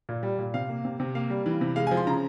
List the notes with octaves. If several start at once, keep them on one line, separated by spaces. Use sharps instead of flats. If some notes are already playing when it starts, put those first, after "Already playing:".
A#2
G3
A#2
C3 F5
A#3
C3
C3
A#3 F5
G3
E3
C3
G#3 F5
G#5
F3
C6
C#3 A#5